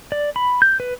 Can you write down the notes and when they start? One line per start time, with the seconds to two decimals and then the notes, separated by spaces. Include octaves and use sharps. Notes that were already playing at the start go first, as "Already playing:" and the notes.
0.12 D5
0.36 B5
0.62 G6
0.80 B4